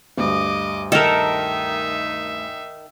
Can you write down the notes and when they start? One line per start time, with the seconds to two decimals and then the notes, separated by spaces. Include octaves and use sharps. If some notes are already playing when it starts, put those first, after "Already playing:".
0.18 D2 G2 D#5 D6
0.92 D#3 D#4 A4 A#4 E5